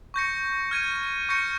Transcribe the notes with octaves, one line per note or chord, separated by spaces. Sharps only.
C#6 G6 A#6 C#7
F6 G#6 D#7
C#6 G6 A#6 C#7